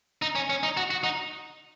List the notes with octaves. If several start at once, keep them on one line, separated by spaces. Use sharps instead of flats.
D#4
C#4
C#4
D#4
F#4
F#4
D#4